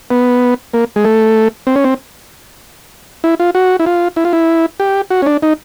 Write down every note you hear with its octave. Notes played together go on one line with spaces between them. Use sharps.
B3
A#3
G#3
A3
C4
C#4
C4
E4
F4
F#4
E4
F4
E4
F4
E4
G4
F#4
C#4
D4
D#4